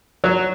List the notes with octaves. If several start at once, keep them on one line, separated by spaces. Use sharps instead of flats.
F#3